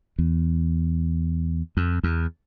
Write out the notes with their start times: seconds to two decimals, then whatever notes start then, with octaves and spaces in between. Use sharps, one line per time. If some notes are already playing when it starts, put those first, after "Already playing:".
0.18 E2
1.77 F2
2.03 E2